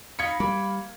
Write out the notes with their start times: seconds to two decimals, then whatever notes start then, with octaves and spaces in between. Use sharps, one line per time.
0.19 D#4 F4 B5 G#6 C#7
0.40 G3 A#3 B5